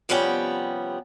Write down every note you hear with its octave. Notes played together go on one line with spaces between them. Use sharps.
C3 F3 G3 B3 C#4 G5